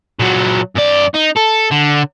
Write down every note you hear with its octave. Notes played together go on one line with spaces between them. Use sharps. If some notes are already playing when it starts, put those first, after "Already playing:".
A#2 F#3
F#2 D5
D#4
A4
D3